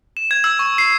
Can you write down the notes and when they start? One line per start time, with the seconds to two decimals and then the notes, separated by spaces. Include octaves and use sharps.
0.17 E7
0.31 G#6
0.44 E6
0.59 C#6
0.78 C7